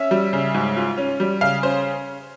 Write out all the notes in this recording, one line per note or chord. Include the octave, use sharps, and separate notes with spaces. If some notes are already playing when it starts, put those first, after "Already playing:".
Already playing: C#4 E5
G3
C#3
G#2
F4
C#4
G3
C#3 F5
C#4 C5